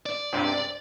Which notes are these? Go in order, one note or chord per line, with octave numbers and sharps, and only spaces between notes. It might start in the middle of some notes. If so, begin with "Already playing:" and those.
D5
C#2 G2 C3